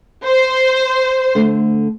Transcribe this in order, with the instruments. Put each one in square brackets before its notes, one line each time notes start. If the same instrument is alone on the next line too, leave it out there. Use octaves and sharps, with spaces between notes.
[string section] C5
[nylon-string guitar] D3 A3